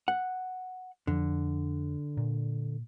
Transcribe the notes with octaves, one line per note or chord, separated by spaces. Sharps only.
F#5
F2 D3 F3
A#2